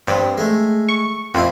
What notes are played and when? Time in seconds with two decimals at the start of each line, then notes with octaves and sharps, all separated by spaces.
0.07 G2 B3 C4
0.38 G#3 A3
0.89 C#6
1.34 F2 A#3 E4 F4